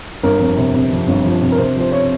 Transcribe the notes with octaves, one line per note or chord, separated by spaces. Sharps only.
G1 A#4
F2
C3
C3
F2
G1
F3
C3
A#4
C3 C5
F3
C5
C#5